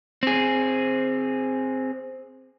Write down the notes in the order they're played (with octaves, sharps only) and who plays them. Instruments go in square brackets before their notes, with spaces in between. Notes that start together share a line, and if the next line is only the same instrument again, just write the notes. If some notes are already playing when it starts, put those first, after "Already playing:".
[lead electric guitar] C4 G#4